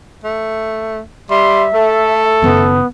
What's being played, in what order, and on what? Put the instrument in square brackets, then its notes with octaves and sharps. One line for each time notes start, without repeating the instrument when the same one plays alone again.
[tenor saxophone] A3
[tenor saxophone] G3 [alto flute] E5 [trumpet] C6
[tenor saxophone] A3 [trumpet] A4
[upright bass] F#1 D#3 [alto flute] B3